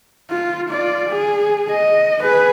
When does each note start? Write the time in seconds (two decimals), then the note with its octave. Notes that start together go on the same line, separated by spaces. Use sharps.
0.31 F4
0.69 F4 D5
1.09 G#4
1.70 D#5
2.22 G#4 B4